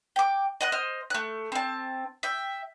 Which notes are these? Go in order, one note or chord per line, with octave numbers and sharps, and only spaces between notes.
G5 D6
D#5 F#5 F#6
C5 D#5 F6
A3 F#6
C4 A5
E5 G5